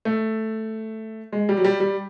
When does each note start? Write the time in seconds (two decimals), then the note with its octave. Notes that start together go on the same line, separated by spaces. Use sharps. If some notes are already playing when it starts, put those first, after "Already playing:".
0.05 A3
1.32 G#3
1.49 G3
1.57 F#3
1.65 G3
1.80 G3